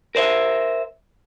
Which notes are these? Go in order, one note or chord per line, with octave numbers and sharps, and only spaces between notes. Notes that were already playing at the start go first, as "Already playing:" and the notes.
A#4 C5 D5 E5